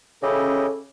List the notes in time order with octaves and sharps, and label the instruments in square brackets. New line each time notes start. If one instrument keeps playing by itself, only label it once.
[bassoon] C#3 [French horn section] C#4 A4 [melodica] E4 G4 D#5